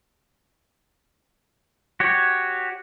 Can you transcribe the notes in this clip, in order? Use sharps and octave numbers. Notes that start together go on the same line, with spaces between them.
F#4 G4 C#5